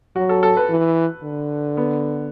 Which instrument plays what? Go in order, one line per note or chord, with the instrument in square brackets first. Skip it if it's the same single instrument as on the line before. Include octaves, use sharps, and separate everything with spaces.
[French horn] F#3 [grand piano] F#4
[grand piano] A4
A4
B4
[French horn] E3
D3
[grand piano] B3